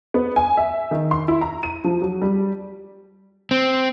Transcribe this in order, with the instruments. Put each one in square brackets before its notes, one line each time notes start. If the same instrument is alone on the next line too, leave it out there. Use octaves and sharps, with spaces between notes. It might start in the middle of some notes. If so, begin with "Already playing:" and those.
[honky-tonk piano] B3
G#5
E5
D#3
C6
E4
A#5
D#7
F3
F#3
G3
[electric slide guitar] C4